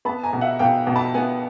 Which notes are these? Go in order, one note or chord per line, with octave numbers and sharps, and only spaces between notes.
B3 A5 B5
G#5 A#5
B2
E5 F#5
B2 F5 G5
B2
A5 B5
B3 F#5 G#5